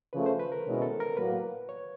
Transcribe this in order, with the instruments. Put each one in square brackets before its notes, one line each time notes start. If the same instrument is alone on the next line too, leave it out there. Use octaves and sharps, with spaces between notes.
[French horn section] C#3 F3 A3 [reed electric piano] B4
[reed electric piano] C5
B4
A#4
[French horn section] B2 G#3 C#4 E4
[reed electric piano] A4
A#4
[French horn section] A2 F#3 A#3 [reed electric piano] B4
[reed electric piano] C#5